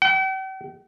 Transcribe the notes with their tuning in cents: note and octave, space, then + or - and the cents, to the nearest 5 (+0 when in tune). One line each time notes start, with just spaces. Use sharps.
G5 -45